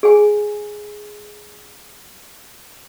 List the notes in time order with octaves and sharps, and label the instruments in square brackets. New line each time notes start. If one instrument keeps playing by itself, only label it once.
[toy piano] G#4 G#5